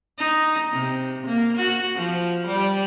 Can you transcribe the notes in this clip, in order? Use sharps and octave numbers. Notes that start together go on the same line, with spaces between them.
D#4
C3
A#3
F#4
F3
G3